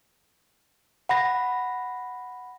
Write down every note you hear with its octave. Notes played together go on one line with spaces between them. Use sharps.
F#5 B5 A#6